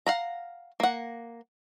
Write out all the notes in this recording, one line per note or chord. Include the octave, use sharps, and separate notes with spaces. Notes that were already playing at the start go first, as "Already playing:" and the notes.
F5 F#5 A#5
A#3 F#5